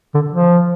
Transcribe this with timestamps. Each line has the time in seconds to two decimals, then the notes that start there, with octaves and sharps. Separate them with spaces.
0.14 D3
0.32 F3